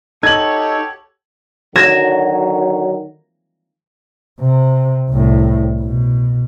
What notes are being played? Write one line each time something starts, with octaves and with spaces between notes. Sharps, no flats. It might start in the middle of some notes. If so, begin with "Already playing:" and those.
D#4 F#4 G4 A4 C#5 G#6 F#7
D3 D#3 F#3 G#6 A#6 E7
C3
C2 A2
B2